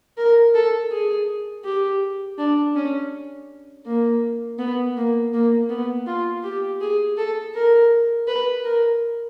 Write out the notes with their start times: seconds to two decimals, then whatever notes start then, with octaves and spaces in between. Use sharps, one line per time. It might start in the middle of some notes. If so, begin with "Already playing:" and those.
0.17 A#4
0.54 A4
0.91 G#4
1.64 G4
2.38 D4
2.76 C#4
3.86 A#3
4.59 B3
4.97 A#3
5.33 A#3
5.69 B3
6.07 F4
6.43 G4
6.81 G#4
7.18 A4
7.55 A#4
8.28 B4
8.64 A#4